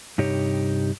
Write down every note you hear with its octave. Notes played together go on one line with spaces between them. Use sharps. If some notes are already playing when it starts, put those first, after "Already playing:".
G2 C3 D#4 G4 C#5